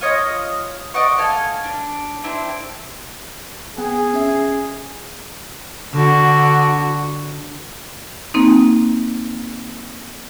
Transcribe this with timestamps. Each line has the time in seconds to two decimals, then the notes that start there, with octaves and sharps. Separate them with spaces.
0.01 F4 C#5 D#5
0.94 D5 D#5 F#5 C#6
1.18 A4 F5 G#5
1.64 D4
2.24 C4 D4 E4 C5
3.77 B3 G#4 F#5 G5
4.14 C#4 E5 C7
5.94 D3 F#4
8.34 A#3 C4 D#4